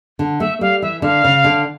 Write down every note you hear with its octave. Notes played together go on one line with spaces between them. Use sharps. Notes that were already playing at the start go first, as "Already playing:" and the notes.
D3
A3 E5
G3 F5
E3 E5
D3 F5
C#3
D3